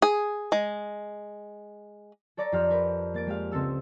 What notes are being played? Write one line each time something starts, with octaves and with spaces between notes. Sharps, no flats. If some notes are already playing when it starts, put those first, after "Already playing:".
G#4
G#3
A4 C#5 D5 A#5 A6
F2 G4 C5 F6
A#4 B4
A#3 A6 D7
G#3 G4 F5
C#2 C4 A4 E6